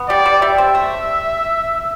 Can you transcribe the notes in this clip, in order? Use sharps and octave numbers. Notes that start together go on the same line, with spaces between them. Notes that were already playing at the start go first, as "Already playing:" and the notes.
Already playing: B3
G3 D5
G3
G3 E5
C4
A3